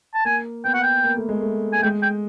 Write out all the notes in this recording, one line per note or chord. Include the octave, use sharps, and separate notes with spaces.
A5
A#3 G#5
B3 G5
F#5
G5
A#3
A3
G#3
A3
A3 G#5
G#3 G5
G5